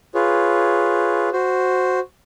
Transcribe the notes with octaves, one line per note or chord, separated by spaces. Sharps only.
F4 G#4 B4 C#5
F#4 C5